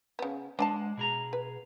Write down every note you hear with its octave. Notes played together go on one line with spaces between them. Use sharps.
C#3 B3
G#3 D4 G#5 A5
B2 G#4 A#5
B4